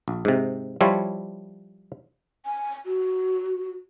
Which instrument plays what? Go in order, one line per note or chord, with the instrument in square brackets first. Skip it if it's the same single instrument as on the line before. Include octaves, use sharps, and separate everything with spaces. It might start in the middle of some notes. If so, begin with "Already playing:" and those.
[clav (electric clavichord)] A#1
G#2 C3
F3 G3 E4 F4 C#5
[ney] G#5
F#4